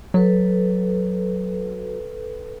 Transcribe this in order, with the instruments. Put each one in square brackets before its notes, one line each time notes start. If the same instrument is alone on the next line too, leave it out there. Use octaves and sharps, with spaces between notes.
[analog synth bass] F#3 [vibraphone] A4 B4